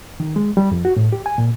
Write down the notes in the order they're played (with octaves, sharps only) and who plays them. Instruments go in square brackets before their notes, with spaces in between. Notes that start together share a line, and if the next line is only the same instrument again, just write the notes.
[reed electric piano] D#3
G#3
G3
F2
F#4
A2
G4
G#5
A#2